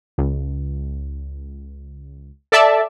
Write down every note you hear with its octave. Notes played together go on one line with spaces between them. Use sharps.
C#2
A4 D5 E5 A5